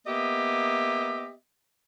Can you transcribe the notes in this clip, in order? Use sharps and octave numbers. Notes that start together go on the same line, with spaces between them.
A#3 B3 G4 D#5 E5